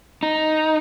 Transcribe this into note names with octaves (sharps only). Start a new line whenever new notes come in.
D#4